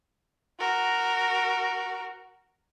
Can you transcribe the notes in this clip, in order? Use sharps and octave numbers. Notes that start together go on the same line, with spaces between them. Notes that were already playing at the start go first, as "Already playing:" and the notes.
F#4 A#4